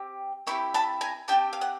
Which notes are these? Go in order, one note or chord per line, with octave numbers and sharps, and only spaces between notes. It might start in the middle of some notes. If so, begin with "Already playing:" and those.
Already playing: C4 G4
C4 E4 G4 B5 C#6
A5 B5
G#5 A#5
C4 E4 G4 G5 A5
F5
F#5